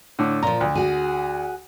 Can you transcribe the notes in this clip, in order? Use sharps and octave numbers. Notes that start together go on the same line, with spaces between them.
A2 D3
A#2 F3 A#5
D2
F#4 G#4